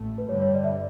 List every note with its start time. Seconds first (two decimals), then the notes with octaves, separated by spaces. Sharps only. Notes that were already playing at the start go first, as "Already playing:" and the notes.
Already playing: A1 A3
0.18 B4
0.28 G2 D3 G3 C#5
0.42 C#5
0.54 D5
0.64 E5
0.72 D5